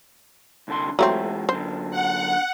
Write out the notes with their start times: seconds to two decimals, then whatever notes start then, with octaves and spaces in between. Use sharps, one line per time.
0.68 C2 D3 C6
0.99 E3 F#3 G#3 A3 C4 G4
1.49 F#2 D3 C5
1.91 F#5